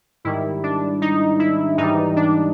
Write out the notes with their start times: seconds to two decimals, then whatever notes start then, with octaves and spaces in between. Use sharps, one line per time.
0.24 G#2 D#3 G3 E4
0.63 D4
1.02 D#4
1.39 E4
1.78 G#2 E3 G3 D#4
2.16 D4